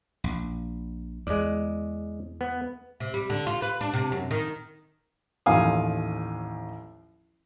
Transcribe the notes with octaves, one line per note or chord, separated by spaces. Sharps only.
A#1
E2 G#3 D5
B3
C3
G3
D3
F4
B4
D4
C3
F#2
D#3
A1 D#2 F3 F5 G#5 D#6